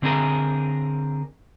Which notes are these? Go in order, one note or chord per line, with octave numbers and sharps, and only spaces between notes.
D3 C4 D4 G#4 A#4